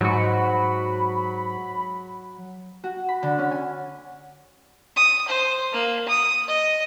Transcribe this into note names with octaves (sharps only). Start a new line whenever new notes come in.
G#2 F#3 F#4 B5
F#4
B5
D3
C#4
G#5
D#6
C5
A#3
D#6
D#5